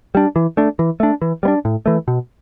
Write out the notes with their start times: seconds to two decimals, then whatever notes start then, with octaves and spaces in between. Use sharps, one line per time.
0.15 G3 D4
0.36 E3
0.57 A3 D4
0.79 E3
1.00 A3 D4
1.22 E3
1.43 G3 B3
1.48 D4
1.65 A2
1.86 E3 A3
2.08 B2